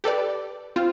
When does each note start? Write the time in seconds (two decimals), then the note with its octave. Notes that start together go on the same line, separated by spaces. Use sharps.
0.04 G4 A4 B4 D5
0.76 C4 F4